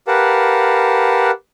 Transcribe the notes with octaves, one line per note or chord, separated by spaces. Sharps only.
G4 A#4 B4 F5 F#5 A5